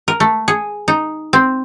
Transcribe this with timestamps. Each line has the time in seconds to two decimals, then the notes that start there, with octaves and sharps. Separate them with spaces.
0.08 A#4
0.20 A3
0.48 G#4
0.88 D#4
1.33 C4